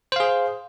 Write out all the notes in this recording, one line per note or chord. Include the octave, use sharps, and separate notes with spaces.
G#4 C5 F5